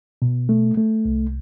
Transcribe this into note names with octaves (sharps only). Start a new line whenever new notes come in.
B2
A3
A3
C2